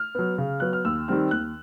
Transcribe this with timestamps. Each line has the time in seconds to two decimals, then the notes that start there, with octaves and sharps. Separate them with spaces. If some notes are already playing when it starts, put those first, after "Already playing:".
Already playing: F6
0.15 F#3 B3
0.38 C#3
0.60 F#3 B3 F#6
0.73 F6
0.85 D#2 E6
1.08 D#3 G3 C4 F6
1.31 D#2 F#6